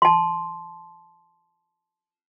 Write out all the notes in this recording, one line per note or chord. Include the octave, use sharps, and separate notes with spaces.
A5 C6